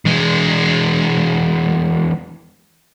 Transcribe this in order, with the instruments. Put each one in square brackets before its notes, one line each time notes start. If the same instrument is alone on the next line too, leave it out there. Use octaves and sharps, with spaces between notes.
[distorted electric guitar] E2 G#3